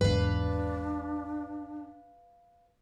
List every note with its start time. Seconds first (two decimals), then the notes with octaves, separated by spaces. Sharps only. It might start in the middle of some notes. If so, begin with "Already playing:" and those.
0.01 G#1 E2 G#2 D4 B4 F5